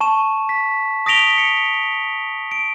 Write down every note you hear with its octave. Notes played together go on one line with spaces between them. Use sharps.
A5 C#6 E7
B6
D#6 A#6 B6 D7 F7 G7
C#7
D7